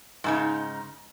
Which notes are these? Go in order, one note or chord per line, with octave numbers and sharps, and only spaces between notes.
G#2 C#3 D#4